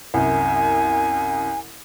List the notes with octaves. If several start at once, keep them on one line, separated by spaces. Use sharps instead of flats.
C2 F#2 G#5